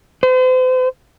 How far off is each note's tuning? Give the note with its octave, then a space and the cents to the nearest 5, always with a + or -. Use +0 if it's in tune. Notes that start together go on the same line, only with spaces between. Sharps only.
C5 -40